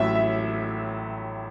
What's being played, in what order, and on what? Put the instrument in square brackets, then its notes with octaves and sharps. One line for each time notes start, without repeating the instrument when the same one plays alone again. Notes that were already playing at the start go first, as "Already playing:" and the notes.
Already playing: [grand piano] A1 A2 F#3 [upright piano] E5
[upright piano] E5